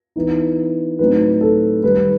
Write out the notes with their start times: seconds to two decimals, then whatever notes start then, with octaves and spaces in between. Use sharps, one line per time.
0.16 E3 B3 D#4
0.99 A2 F#3 C4 D#4 B4
1.41 A4
1.82 D#3 G3 D#4 B4